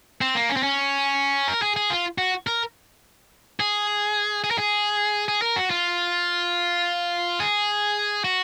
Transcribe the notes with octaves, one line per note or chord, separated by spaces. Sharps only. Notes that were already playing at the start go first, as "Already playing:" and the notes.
C4
A#3
C#4
C4
C#4
A#4
G#4
G#4
F4
F#4
A#4
G#4
G#4
A#4
G#4
G#4
A#4
F#4
F4
G#4
F#4